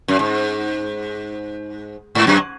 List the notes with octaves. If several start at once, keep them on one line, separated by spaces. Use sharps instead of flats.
F#2
G#2
G#2
F#2